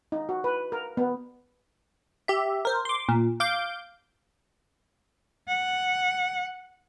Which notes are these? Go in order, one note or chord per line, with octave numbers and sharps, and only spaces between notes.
D#4
F#4
B4
A#4
B3
G4 E5
A#4 C5
C6 D6
A#2
F5 D6 G6
F#5